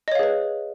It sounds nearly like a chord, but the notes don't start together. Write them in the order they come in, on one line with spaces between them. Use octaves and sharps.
D#5 C#5 F5 G#4 B4